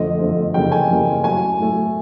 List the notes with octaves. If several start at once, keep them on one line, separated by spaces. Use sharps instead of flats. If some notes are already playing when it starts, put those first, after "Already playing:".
Already playing: F2 D3 F3 A3 D#5
F2 D3 F3 A3
F2 C#3 E3 G3 A#3 G5
G#5
F2 C#3 E3 G3 A#3
A2 F#3 A3 G#5
A2 F#3 A3